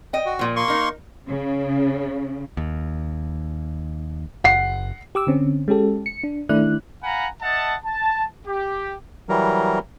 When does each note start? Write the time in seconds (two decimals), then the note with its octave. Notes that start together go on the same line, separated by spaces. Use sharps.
0.13 D#5 G5
0.26 F#4
0.39 A#2 F3
0.56 A#3 C6 C#6
0.68 D#4 A#4
1.27 C#3
2.57 D#2
4.44 F#1 F#5 C7
5.15 G4 D6 E6
5.27 D3 C4 C#4
5.68 G#3 C#4 G4 A4
6.06 C#7
6.24 D4
6.49 D#3 A3 D4 E4 D5 F#6
7.03 F5 F#5 G#5 A#5 B5
7.42 D#5 E5 F#5 A5
7.85 A5
8.46 G4
9.29 E3 F#3 G3 A#4